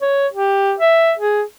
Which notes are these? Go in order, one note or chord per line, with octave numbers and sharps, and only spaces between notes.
C#5
G4
E5
G#4